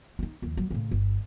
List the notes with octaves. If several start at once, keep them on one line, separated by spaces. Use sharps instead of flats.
D#4 E4
D#2 F3
F#3
A2 C#3
G1